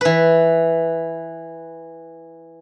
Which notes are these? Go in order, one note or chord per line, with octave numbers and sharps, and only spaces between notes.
E3 B4